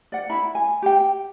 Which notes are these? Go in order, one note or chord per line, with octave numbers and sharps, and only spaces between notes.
D5 F#5
E4 B5
G#5
G4 G5